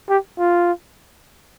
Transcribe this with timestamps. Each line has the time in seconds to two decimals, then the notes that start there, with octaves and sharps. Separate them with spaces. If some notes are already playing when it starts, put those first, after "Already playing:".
0.09 G4
0.38 F4